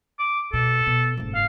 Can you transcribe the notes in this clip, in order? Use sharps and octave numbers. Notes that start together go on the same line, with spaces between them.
D6
B2 A4
B2
F#1 G#2
F5